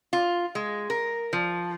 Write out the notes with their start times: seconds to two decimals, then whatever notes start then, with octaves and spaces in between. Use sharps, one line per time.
0.13 F4
0.55 G#3
0.90 A#4
1.33 F3